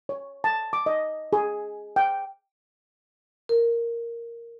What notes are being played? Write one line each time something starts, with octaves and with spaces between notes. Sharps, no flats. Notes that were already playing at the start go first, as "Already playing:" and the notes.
C#5
A5
D6
D#5
G#4
G5
A#4